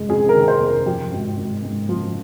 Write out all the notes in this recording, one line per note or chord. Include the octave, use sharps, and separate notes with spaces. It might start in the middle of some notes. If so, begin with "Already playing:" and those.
Already playing: F1 G#3
F2 G#4
A#4
D#3
C5
F1
A#4
F3 G4
G#1
G#1
G#2
F3